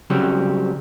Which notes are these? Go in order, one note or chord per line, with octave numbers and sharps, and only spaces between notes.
C#3 F#3 G3 C4